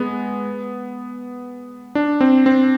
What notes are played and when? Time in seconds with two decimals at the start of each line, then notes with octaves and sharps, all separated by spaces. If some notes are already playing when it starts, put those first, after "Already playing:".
Already playing: G#3 B3
1.95 D4
2.21 C4
2.46 C4